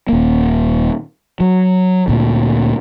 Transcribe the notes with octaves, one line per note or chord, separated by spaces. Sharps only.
D#1 A#3
F#3
D2 A#2